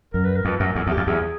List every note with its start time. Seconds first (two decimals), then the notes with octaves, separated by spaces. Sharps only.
0.13 F#2 A#4
0.24 B4
0.36 A#4
0.45 F2 B4
0.57 F#2 A#4
0.75 E2 A4
0.87 E2 G4
0.97 F2
1.07 E2 G#4